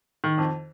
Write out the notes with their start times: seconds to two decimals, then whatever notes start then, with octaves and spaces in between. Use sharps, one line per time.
0.24 D#3
0.38 F2